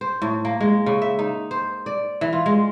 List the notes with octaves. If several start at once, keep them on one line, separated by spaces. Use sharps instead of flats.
C5
A2
A#3
G#3
C#3
E5
D#4
C5
D5
E3
F4
G#3